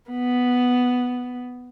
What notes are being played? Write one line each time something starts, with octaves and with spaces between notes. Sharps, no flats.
B3